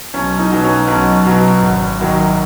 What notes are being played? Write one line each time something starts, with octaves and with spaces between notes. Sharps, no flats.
B1 C#4
D#4
B2 F#3
C#4
B1 C#4
B2 F#3
G#1
F#2 D#3 F#3